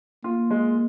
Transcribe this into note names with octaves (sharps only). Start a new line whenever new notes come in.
A#3 F4
G#3